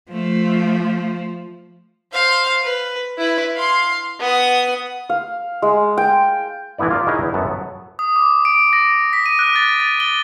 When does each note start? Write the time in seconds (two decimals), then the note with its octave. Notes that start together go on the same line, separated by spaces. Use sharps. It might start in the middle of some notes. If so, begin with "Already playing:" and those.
0.12 F3 A3
2.12 C5 F5
2.63 B4
3.18 E4 B4
3.56 F5 C6
4.19 B3 D#6
5.10 F5
5.62 G#3
5.97 G5
6.78 E3 A3 B3 E4 D5
6.90 F4 A#4 D5
7.07 D#4 E4 F#4 G#4 A#4 C#5
7.21 E2
7.34 F#2 B3 A4 F#5 A5
7.47 F#3
7.99 D#6
8.16 D6
8.45 D7
8.73 A#6
9.13 B6
9.26 D#7
9.39 F#6
9.56 A6
9.80 A6
10.00 G7